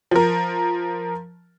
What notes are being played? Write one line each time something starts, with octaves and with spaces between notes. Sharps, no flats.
F3 A#4